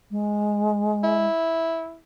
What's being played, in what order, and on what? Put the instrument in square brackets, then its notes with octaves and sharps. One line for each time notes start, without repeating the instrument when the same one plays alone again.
[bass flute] G#3
[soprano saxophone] E4